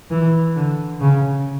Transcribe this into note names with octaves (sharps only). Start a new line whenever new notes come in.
E3
D3
C#3